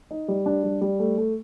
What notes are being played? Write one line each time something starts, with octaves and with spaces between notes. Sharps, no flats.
D#4
G3
D4
G3
G3
A3
A3